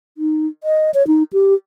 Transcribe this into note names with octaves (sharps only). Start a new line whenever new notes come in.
D#4
D#5
C#5
D#4
G4